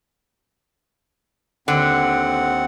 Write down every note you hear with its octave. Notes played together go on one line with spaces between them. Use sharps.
D#2 D3 C4 F#5